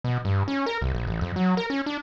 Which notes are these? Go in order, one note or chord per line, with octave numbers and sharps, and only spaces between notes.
B2
G2
C#4
A#4
C2
A#1
A1
F2
F#3
A#4
C#4
D4